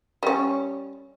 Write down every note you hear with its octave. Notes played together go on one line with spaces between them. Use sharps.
G3 C#4